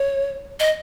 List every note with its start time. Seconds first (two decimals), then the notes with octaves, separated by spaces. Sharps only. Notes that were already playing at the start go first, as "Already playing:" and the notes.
Already playing: C#5
0.60 D#5